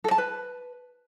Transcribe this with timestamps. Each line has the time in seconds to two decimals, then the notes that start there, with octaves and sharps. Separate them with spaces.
0.04 A4
0.11 A5
0.18 B4